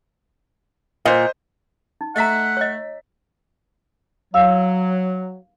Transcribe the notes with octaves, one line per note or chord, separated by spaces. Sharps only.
A#2 C5 D#5
D#4
A3 D#5 E5 F#5 A#5 B6
C#5 D#5
F#3 F5 E6